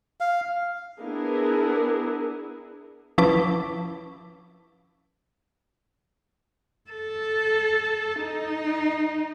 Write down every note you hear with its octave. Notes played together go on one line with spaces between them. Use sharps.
F5
B3 D4 E4 G#4 A#4
F3 C#4 E4 B4 A5 D6
A4
D#4